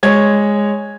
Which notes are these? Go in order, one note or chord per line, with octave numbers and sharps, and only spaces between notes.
G#3 C#5 G#6